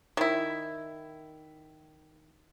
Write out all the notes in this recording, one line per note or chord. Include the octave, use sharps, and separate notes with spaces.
D#3 E4